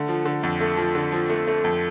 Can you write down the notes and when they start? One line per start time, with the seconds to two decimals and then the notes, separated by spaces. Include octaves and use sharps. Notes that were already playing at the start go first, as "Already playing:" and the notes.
Already playing: D3 A3
0.08 F3
0.26 D3
0.43 F2
0.61 A3
0.77 F3
0.95 D3
1.12 F3
1.30 A3
1.47 A3
1.64 F2